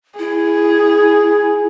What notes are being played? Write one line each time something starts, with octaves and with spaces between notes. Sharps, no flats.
E4 G#4